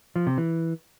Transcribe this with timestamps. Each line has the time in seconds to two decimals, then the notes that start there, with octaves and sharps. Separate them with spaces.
0.16 F3
0.27 C3
0.38 E3